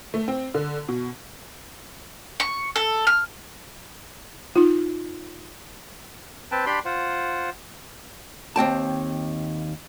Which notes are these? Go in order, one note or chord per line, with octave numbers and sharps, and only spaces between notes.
A3
C4
D3
B2
C#6
A4
F6
D#4 F4
C4 B4 G5 A5
D4 G4 G5 B5 C6
F4 C5 F#5
D#2 C4 G5 A5